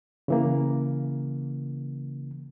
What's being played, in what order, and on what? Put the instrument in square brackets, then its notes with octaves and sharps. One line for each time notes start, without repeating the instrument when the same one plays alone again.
[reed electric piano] C#3 E3 A#3